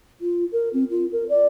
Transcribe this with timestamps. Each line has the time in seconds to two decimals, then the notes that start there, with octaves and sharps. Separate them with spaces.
0.21 F4
0.52 A#4
0.73 C4
0.90 F4
1.12 A#4
1.29 D5